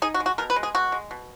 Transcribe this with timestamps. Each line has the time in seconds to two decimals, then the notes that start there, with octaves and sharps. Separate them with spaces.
0.02 D#4 G#4
0.14 F#4
0.20 G#3
0.26 F#4
0.38 B2 A#4
0.50 B4
0.56 G#3
0.63 G#4
0.75 B2 F#4
0.92 G#3
1.11 B2